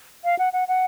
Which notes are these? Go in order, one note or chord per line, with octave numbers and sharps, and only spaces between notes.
F5
F#5
F#5
F#5